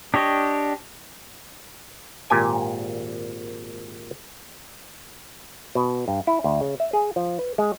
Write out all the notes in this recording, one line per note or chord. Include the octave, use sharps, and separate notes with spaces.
D4 G4 C#5 D#5
G#1 A#2 G4 G#5
B2
G2
E4
D2
C#3
E5
G#4
F3
B4
G#3